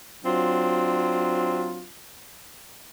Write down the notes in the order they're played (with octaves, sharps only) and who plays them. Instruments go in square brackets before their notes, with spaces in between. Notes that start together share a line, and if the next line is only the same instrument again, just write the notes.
[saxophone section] F#3 C4 D4 F4